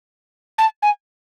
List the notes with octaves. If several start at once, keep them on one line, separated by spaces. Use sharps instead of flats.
A5
G#5